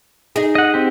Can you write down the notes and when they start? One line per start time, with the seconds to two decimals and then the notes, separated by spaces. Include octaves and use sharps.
0.36 D#4 G#4
0.55 D#5 F#5
0.74 C4 G4